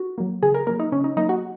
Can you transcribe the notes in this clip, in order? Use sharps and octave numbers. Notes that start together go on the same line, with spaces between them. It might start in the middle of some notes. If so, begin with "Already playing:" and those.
Already playing: F#4
F#3 A#3
C#3 G#4
A#4
F#3 A#3 A#4
D#4
C#3 C#4
D#4
F#3 A#3 D#4
F#4